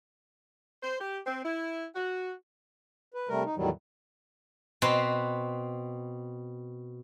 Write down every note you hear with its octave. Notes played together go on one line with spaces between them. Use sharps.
C5
G4
C4
E4
F#4
B4
C3 G3 A3 A#4
D#4
E2 A2 D#3 F#3 G3
B2 C4 B4 C6